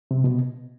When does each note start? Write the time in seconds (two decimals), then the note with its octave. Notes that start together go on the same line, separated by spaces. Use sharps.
0.11 C3
0.24 B2